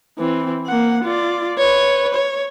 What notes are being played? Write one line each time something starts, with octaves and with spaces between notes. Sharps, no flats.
E3 C4
A#3 F#5
F4 D5
B4 C#5
C#5